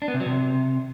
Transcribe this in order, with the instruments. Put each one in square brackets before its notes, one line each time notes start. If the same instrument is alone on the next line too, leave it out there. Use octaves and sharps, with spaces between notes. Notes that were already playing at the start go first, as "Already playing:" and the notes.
[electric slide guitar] D4
B3
C3
F#3
C3